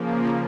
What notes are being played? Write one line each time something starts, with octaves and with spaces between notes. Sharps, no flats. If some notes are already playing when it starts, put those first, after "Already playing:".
Already playing: C#3 F3 A#3